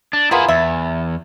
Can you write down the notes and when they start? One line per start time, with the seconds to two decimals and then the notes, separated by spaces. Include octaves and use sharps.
0.13 D4
0.31 B3 E4 F4 G#4 A#4
0.49 E2 E5